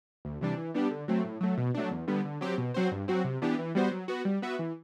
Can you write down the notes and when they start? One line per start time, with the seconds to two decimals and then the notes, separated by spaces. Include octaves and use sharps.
0.25 D2
0.41 C3 E3 G3 D4
0.57 E3
0.74 G3 B3 D4 G4
0.91 D3
1.08 F#3 A3 C4
1.24 A2
1.41 F#3 A3
1.58 B2
1.74 F#3 A3 D4
1.91 E2
2.08 D3 G3 B3
2.25 D3
2.41 F#3 C4 G4
2.58 B2
2.74 F#3 C4 F#4 C5
2.92 G2
3.08 F#3 C4 F#4
3.25 C3
3.42 E3 B3 D4 G4
3.59 E3
3.75 G3 B3 F#4 C5
3.91 F#3
4.08 B3 F#4
4.25 G3
4.42 B3 F#4 B4 E5
4.59 E3